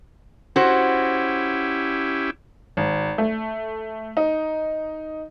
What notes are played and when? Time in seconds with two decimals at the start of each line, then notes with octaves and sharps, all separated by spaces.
0.56 C#4 E4 F#4 G4 C5
2.77 G#1
3.18 A3
4.17 D#4